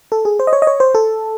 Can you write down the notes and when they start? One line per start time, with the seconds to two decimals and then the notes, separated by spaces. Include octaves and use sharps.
0.12 A4
0.25 G#4
0.39 C5
0.47 D#5
0.53 C#5
0.62 D#5
0.67 C#5
0.80 C5
0.95 A4